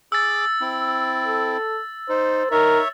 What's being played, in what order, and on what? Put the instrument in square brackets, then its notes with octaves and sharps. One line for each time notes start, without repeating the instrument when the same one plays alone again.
[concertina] G#4 D6 [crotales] E6 A6
[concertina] C4 E4
[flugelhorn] A4
[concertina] D#4 [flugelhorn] C5
[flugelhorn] D#4 [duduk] A#4 [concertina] C#5 E5